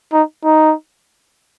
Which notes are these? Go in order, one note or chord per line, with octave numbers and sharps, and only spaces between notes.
D#4
D#4